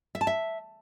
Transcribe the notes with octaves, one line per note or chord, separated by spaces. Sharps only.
E5
A5
E5